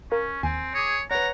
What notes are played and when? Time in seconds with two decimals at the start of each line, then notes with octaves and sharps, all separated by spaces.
0.12 C#4 A#4 F5
0.43 D#2 C4 G#5
0.75 G#4 C#5 D6 A#6
1.11 B4 C#5 F#5 A#5